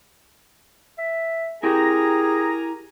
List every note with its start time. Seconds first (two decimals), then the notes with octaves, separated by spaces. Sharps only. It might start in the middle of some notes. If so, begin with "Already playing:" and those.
0.98 E5
1.63 E4 G4 G#4 A#4 G5 G#5 A#5